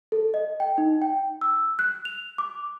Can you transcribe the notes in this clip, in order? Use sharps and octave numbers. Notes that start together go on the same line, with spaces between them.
A4
D#5
G5
D#4
G5
E6
F#6
F7
D6